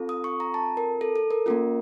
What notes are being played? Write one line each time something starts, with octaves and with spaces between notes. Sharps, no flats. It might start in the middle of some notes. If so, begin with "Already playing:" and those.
Already playing: C4 F4 A4
D#6
C#6
A#5
A5
A#4
A4
A4
A#4
A#3 C#4 F4 A#4